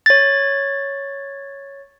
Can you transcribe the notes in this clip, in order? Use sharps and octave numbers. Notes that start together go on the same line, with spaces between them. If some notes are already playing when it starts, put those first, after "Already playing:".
C#5 A6